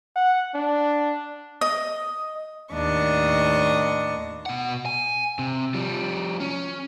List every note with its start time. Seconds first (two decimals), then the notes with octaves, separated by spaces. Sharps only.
0.16 F#5
0.55 D4
1.61 D#5
2.74 D#2 A2 D4 D#5 C#6
4.46 B2 F#5
4.86 G#5
5.39 C3
5.74 F3 G3
6.40 C#4